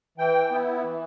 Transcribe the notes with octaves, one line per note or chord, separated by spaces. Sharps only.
E3 G5
B3 E4
E3